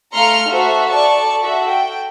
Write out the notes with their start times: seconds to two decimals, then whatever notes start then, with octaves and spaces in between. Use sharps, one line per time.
0.15 A3 F5 A#5 C6 F6 C#7
0.50 F#4 A4 C5 E5
0.91 A4 D5 A5 C#6
1.40 F#4 A4 E5
1.70 G5